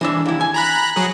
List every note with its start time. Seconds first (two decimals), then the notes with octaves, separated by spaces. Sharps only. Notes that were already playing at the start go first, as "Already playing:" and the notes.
0.01 E3 D4 E5
0.26 D#2 E4
0.41 G#5
0.54 A#5 B5 F#6
0.95 F#3 G#4 F#6